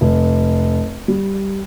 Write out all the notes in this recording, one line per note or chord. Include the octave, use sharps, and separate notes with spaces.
F1
G3